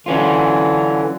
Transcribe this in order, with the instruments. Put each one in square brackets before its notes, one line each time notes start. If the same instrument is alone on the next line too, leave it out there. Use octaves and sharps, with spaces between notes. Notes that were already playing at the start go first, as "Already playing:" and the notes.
[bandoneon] D3 E3 [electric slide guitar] F#3 C#4 F4